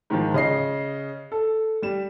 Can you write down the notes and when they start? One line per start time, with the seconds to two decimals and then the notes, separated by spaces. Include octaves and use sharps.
0.10 G#2 D#3 F3
0.34 C#3 D#5 C7
1.32 A4
1.82 G3 E7